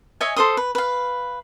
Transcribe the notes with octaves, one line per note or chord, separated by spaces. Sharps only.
C#5 D#5 E5 G#5
A4 C5 C6 D#6
B4
B4 F5